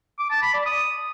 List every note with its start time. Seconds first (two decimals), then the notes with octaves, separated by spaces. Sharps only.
0.19 D6
0.31 A5
0.42 B5
0.54 D5
0.66 D#6